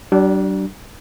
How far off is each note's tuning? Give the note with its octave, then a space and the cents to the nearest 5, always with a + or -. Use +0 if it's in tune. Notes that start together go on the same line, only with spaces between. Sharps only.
G3 -45 D4 +0